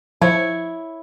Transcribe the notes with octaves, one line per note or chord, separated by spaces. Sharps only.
F3 E4 C#5